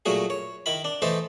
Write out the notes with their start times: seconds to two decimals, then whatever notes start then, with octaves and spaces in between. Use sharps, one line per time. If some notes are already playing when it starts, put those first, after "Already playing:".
0.06 A#2 F#3 A3 F#4 G#4
0.30 C#5
0.66 D#3 E4 B5
0.85 D4
1.02 E3 A3 D#4 A4 C5